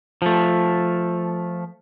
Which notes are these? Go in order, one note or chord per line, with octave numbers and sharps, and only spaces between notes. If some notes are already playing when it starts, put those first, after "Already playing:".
F3 A3